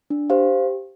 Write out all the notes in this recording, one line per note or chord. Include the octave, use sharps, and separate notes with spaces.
D4
G4 C5 F5